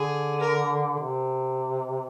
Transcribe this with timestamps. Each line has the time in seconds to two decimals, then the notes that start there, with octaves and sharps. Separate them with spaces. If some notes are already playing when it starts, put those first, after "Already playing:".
Already playing: D3 G#4
0.40 A#4
1.00 C3